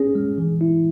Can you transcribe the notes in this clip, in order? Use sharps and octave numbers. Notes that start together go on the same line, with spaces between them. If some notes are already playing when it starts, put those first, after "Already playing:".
Already playing: C#4 G#4
G#3
E3
E4